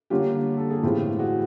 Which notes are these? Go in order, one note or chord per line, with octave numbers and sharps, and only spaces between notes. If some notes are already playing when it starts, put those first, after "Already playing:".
D3 G3 A#3 C#4 F4 G4
A4
G#4
A2 E3 G#3 C4 F4 G4
F#4 G#4